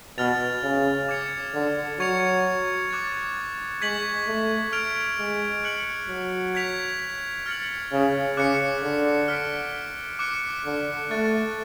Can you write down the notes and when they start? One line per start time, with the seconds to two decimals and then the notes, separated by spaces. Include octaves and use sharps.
0.18 B2 F6 A6 F7
0.63 C#3
1.09 D6 G#6 C#7 F7
1.54 D3
2.00 F#3 C#6 G#6 C#7 F7
2.90 D6 F#6 A6
3.81 G#3 C#6 G#6 B6 F#7
4.27 A3
4.72 F6 G#6 D7 F7
5.18 G#3
5.64 F#6 C#7 F#7
6.09 F#3
6.55 G#6 B6 F7
7.46 F6 A6 C#7 F#7
7.92 C#3
8.37 C#3 D6 F#6 C#7
8.83 D3
9.28 F6 B6 D7
10.19 D6 F#6 C#7
10.65 D3
11.10 A3 C#6 F#6 A6